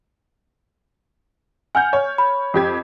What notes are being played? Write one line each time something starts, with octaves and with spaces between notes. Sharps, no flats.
F#5 G#5 F6 G6
C#5
B5
F2 G4 G#6